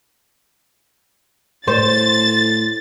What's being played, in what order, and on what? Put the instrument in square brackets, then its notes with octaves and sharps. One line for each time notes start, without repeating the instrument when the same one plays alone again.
[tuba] A2 [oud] C5 [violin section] A6